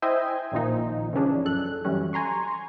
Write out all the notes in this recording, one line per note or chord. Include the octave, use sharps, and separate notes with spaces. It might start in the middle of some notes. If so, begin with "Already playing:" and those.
E4 C5 D#5 E5 G5 G#5
A#1 A#2 D#3 F3 D#4
C#3 E3 F3 C#4 D4 G#4
F#2 A4 F#6
E3 F#3 G3 C#4
G#5 A#5 C6 C#6